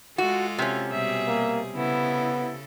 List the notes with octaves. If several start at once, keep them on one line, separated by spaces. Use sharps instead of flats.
G#3 F4 F#4 A4
C3 C#4
B2 G3 G#4 E5
A#3
C#3 B3 E4 A4